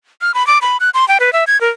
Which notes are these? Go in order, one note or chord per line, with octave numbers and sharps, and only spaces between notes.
F6
B5
D6
B5
F#6
C6
G5
B4
E5
G#6
A#4